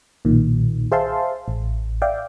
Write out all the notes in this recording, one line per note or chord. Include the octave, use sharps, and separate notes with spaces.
B1 A#2 D#3
G#4 C5 E5 F5 A5 C6
A1
D5 E5 F5 G5